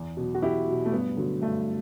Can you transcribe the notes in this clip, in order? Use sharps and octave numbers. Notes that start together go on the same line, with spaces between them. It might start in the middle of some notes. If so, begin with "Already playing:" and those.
Already playing: E2
B2 F#3
F#4
E2 E4 G4
B2 F#3
A3
G2 B3
D3 F#3
G2 A3